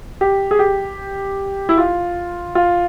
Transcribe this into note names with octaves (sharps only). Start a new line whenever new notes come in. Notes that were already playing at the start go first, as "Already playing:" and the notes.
G4
G#4
G4
E4
F4
F4